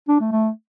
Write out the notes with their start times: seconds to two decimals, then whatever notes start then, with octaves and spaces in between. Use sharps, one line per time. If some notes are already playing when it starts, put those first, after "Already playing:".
0.08 D4
0.20 A3
0.32 A3